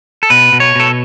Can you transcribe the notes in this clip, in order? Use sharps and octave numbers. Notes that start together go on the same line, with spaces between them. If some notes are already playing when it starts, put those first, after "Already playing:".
A4
B2 B4
B2
C#5
B2 A4